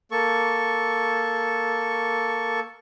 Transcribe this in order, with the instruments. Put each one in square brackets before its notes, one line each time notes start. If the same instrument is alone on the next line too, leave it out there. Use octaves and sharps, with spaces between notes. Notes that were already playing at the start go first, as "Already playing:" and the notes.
[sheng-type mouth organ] A#3 A4 C#6